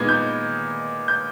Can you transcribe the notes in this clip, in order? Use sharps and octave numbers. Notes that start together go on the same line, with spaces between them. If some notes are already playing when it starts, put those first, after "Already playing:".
Already playing: A#2 G#3 B3 D#4 G#6
G6
G6